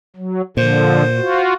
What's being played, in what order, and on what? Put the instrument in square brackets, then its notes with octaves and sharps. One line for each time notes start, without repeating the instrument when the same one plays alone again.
[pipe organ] F#3
[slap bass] A#2 [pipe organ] D3 F3 [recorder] C5
[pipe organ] F4 F#4